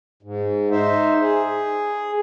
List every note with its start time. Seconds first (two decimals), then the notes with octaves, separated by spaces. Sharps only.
0.23 G#2
0.71 D#4 C5 E5
1.22 G#4